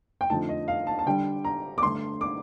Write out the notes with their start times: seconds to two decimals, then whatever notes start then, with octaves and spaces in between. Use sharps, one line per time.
0.21 G5
0.30 F2 D3 A3 D#4 A5
0.49 D#5
0.68 F5
0.87 A5
0.99 A5
1.06 D3 G3 D4 G5
1.45 A#5
1.78 D6
1.83 G2 D3 A3 C6
2.21 D6